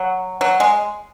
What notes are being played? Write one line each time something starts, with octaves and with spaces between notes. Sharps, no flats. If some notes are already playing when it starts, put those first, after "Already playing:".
Already playing: F#3
F#3
G#3